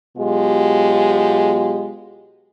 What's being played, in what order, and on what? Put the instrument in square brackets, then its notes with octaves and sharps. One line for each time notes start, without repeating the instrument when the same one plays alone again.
[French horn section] B2 F#3 G#3 F4 G4